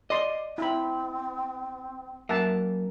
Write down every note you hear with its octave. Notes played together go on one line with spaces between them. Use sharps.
D5 D#5 C6
C4 E4 B5
F#2 A#3 E5 F#5 A5